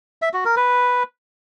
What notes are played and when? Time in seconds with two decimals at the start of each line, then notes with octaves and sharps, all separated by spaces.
0.22 E5
0.34 F#4
0.45 A#4
0.57 B4